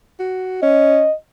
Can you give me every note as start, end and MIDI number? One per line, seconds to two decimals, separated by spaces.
0.19 0.58 66
0.62 1.06 61
0.62 1.13 75